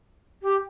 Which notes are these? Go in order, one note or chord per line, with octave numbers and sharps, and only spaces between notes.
G4